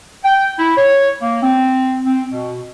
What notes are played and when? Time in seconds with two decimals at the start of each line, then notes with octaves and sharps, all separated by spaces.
0.24 G5
0.58 E4
0.77 C#5
1.22 A#3
1.43 C4
2.06 C4
2.31 B2